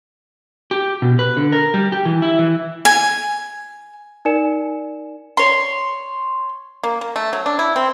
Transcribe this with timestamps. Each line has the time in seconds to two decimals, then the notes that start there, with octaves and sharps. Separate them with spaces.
0.71 G4
1.02 B2
1.19 B4
1.37 D3
1.52 A#4
1.74 G3
1.92 G4
2.05 E3
2.22 E4
2.39 E3
2.85 G#5
4.25 D#4 A#4 D5 G#5 C#7 E7
5.37 C#5 C6
6.83 A#3
7.01 A#3
7.16 A3
7.33 F#3
7.46 D4
7.59 E4
7.76 C4